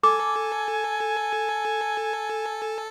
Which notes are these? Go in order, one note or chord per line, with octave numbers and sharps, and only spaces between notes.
A4 G#5 D6